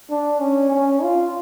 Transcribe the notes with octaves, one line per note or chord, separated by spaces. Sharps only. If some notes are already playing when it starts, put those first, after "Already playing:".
D4
C#4
C#4
F4